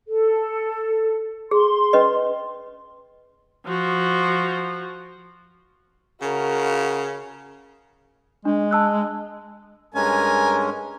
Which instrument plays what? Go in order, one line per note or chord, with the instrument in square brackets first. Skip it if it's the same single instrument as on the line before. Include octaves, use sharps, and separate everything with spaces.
[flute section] A4
[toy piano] G#4 [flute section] C6
[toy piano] C#4 B4 D#5
[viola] F3 F#4
[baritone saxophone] C#3 [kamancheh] F#4 A#4
[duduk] G#3 [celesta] D4
[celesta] A5 E6 F#6
[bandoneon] G2 G#3 C#4 [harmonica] A#4 G#5